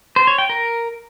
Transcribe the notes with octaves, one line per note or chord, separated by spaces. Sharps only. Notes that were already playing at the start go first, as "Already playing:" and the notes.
C5
C#5
G5
A#4